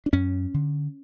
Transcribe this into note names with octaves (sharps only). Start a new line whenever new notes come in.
D4
F#2 C#4
D3